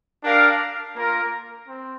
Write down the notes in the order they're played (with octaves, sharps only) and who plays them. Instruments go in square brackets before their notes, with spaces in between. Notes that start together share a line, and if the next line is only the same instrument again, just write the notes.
[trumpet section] D4 G4 A#4 F5
A#3 F4 A#4
C4